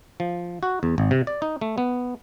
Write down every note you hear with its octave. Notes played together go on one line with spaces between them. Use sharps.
F3
F#4
E2
G#1
C3
D5
D#4
A3
B3